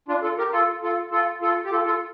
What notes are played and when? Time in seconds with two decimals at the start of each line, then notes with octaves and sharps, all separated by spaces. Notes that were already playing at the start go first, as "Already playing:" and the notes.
0.08 D4 F4
0.23 F4 A4
0.38 G4 A#4
0.52 F4 A4
0.83 F4 A4
1.12 F4 A4
1.41 F4 A4
1.65 G4
1.72 F4 A4
1.86 F4 A4